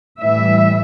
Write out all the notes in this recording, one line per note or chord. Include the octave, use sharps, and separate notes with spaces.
A2 E3 G3 E5